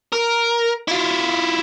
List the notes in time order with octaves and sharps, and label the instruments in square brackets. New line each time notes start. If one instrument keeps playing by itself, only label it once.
[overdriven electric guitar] A#4
E4 F4